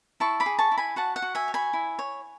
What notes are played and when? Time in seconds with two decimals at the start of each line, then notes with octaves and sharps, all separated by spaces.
0.20 E4 A5 C#6
0.40 B5 D6
0.46 G#4
0.59 A5 C#6
0.72 E4
0.78 G#5 B5
0.96 F#4 F#5 A5
1.16 F#5
1.22 F#4
1.35 E5 G#5
1.48 C#5
1.54 G#5 B5
1.73 E4
1.99 C#5